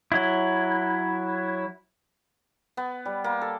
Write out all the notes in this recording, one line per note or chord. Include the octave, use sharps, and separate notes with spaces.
F#3 E4
B3
G3
A#3
A4